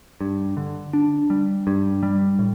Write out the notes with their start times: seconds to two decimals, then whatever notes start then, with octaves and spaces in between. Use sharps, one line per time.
0.21 G2
0.57 D3
0.93 D4
1.30 G3
1.67 G2
2.03 G3
2.39 A2